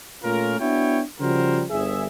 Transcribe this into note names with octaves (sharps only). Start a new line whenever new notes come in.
A#2 A3 C#4 F4 A#4
B3 D4 E4 F#4 C#5 G5
C#3 F3 G3 F#4 A#4 C5
G1 G#4 E5